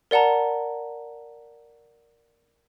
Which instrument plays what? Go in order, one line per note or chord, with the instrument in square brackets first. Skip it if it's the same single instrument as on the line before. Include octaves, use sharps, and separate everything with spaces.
[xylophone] A#4 D5 F#5 A5 A#5